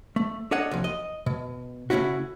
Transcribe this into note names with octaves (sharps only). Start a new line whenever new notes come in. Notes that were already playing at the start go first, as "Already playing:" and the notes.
A3
D4 A4 C#5 D#5 F#5
C2 F3
D#5
B2
C#3 A3 C#4 E4 F#4